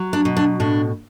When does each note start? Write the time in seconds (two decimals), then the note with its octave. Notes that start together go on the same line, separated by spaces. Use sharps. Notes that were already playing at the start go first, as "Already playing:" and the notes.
Already playing: F#3
0.13 D4
0.25 B2
0.37 D4
0.60 A2 D4